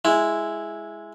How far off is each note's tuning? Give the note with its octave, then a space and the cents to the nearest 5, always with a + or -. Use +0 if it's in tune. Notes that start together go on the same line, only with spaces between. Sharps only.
G#3 +0 E4 +0